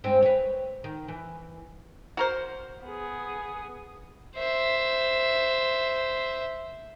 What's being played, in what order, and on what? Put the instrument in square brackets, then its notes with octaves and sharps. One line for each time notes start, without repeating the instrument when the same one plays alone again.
[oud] G2 G#3 C4
B4 C#5
D#3
E3
[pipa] F#4 A#4 C5
[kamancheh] B3 G#4
[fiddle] C5 E5